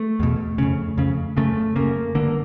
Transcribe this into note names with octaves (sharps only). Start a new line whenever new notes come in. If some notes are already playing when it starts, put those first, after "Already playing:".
Already playing: A3
E2 B2
F2 C#3
F2 C#3
F#2 C#3 A3
F#2 C#3 A#3
G2 D3 A#3